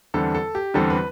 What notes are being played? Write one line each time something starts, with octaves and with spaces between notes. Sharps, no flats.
E2 D3 G3 C4 A4
A4
G4
E2 D3 G3 C4 A4
B4